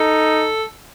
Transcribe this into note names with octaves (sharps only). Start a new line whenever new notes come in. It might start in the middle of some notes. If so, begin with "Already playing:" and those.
Already playing: D#4 A4